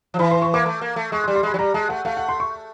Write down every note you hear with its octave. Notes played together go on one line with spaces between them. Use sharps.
F3
E3 B5
C6
C#6
A#3 D6
A3
A#3
A3
G#3 C#6
C6
G3
C6
G#3 B5
F#3
G3 A#5
G#3 A5
A3 F#5
A3 F5
F#5
C6
C#6